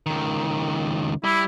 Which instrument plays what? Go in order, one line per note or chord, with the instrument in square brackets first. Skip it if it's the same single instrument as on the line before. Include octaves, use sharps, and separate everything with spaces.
[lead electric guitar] C#2 D#3
[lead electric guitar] G3 [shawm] E4